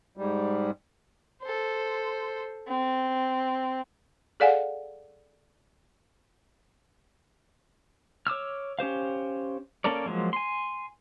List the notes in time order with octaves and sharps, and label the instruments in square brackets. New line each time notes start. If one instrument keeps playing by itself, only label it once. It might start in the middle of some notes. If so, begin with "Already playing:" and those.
[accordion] G#2 G3
[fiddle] A4 C5
C4
[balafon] G#4 A4 D5 F5 F#5 G#5
[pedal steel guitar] C#5 D6 E6 F6
C#4 G4 C5 F5
A#3 C#4 A4 A#4 D5
F3 F#3 G#3 A#3
G#5 C6